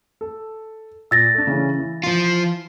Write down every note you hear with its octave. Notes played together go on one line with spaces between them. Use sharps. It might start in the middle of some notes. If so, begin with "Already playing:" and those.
A4
A#2 E6 A6 A#6
A3 D4
C#3 E3 C#4
E3
F3 F4